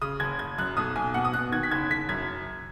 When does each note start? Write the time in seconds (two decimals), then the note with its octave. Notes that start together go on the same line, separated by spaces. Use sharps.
0.02 C#3 D#6
0.20 F#1 G#6
0.39 F#1 G#6
0.58 F#2 F#6
0.77 B1 D#6
0.96 B1 G#5
1.14 B2 F#5
1.25 D#6
1.34 B2 F#6
1.52 D#3 G#6
1.63 B6
1.71 F#1 G#6
1.90 F#1 B6
2.09 F#2 G#6